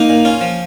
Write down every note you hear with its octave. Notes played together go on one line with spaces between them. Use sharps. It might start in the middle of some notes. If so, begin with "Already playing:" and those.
Already playing: A#3 D#4
A#2
C#4 F4
F3